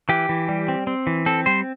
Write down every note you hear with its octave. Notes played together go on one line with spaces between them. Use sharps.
E3 G4
E3
G3
C4
C4
E3
C4 A4
G3 C5